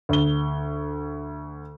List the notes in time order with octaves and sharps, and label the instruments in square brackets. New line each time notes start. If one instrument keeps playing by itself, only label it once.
[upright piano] D2 G7